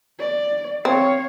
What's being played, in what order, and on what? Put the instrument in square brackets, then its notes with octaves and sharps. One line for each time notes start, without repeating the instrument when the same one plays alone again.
[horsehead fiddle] D5
[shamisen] C4 [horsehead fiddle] C#5 F5